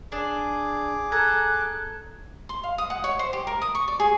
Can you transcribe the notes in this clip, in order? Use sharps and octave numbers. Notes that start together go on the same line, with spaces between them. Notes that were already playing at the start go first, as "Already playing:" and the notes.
D4 G#4 D6
A4 A#5 F#6 G#6
C6
F5
D#6
F#5
C#5
C5
G4
A#4
D#6
C#6
D5
G#4